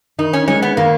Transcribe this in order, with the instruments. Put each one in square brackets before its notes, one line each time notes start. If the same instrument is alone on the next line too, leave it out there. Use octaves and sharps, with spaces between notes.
[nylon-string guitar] D#3 [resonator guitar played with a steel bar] D#4
[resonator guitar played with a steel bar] C#4
[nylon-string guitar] G#3 D#4 [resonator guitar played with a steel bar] C#4
[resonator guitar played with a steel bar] B3
[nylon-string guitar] D#3 [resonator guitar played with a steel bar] A#3